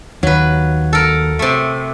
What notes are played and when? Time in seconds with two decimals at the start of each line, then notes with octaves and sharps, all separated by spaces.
0.23 D#2 F#3 B4
0.93 A4 A#4
1.39 C3 A3